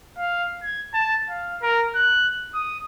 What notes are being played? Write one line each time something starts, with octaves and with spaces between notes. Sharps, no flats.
F5
G#6
A5
F5
A#4
F#6
D#6